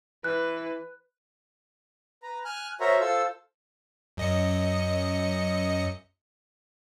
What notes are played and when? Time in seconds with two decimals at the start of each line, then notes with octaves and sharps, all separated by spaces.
0.24 E3 B4 F#6
2.23 B4 A#5
2.45 G#5 F6 F#6
2.80 F#4 A#4 C5 C#5 E5 A#5
3.00 F4 A4 C5 E6
4.17 F#2 D#5 C#7